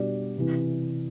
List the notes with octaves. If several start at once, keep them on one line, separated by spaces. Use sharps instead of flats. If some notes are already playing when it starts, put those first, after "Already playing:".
Already playing: B2 G3 D4 G4 D5
C3 E3